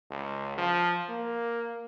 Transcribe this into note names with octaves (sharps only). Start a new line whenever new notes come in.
C#2
F3
A#3